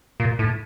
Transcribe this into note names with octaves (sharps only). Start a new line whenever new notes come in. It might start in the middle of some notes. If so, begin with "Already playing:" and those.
A#2
A2